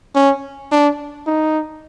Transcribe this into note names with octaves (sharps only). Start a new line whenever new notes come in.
C#4
D4
D#4